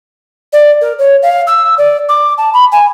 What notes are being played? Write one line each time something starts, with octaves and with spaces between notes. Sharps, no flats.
D5
A#4
C#5
F5
E6
D5
D6
A5
B5
G#5